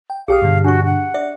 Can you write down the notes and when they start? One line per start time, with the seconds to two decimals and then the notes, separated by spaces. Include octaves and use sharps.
0.10 G5
0.28 B1 G4 G#4 F5 G5 D#6
0.42 G2 B2 D3
0.64 D4 F#4 C#6
0.85 F#5
1.14 D5 E5